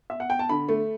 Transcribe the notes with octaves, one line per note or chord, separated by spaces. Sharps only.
E5
F#5
G5
A5
D3 B5
A3